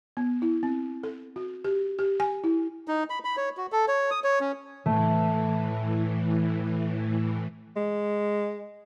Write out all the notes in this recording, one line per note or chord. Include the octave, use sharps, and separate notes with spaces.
B3
E4
C4
A4
F#4
G4
G4
G#5
E4
D#4
B5
B5
C#5
F#4
A4
C#5
D#6
C#5
C#4
A2 E3 A3
G#3